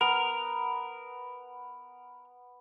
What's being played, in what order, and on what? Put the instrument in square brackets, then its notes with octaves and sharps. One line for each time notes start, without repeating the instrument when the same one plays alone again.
[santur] B3 [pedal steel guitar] A#4